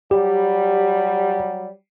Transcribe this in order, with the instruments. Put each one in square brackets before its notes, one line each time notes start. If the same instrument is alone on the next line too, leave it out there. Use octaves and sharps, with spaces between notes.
[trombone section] F#3 G3 [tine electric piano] G4